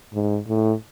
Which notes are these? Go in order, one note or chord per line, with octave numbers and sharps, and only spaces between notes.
G#2
A2